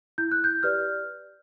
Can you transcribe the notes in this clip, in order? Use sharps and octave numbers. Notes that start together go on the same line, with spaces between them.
E4 G6
F#6
G6
G4 B4 D5 F6